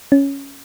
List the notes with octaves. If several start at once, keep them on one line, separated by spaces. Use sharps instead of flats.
C#4